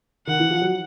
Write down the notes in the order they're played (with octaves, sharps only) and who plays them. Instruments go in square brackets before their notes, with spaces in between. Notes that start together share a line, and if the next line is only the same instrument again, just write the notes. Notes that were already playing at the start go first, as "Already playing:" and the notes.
[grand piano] D#3 [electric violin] F#5
[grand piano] E3
F3
F#3